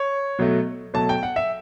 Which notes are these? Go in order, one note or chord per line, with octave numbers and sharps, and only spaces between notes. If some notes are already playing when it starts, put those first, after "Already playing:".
Already playing: C#5
B2 F#3 A3
B2 F#3 A3 A5
G5
F#5
E5